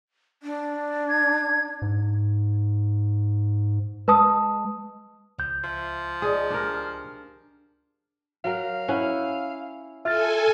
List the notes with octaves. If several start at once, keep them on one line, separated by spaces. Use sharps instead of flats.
D4
G#6
G#2
G#3 B4 A5 D#6
C#2 F3 G6
F3 E5
D#4 G#4 D5 D#5
D4 G4 A#4
F#3 A#4 F5
C#4 E4 F#5
F4 A4 E5 G#5 F6 A6